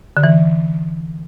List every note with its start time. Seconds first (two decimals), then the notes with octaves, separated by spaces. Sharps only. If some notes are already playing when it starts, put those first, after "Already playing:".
0.17 D3
0.24 E3